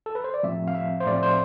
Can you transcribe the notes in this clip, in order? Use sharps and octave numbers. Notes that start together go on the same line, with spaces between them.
A4
B4
C5
D5
A2 F3 A3 C4 E5
F5
E5
C5
A2 F3 A3 C4 D5
C5